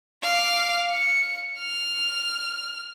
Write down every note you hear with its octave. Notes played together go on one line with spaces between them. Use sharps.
F5 D6
C#7
F6